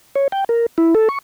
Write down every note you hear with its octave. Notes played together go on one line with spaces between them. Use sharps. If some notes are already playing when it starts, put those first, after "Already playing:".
C#5
G5
A#4
E4
A4
C#6